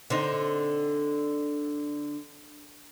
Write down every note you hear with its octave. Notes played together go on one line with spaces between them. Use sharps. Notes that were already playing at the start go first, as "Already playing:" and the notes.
D3 C4 D#4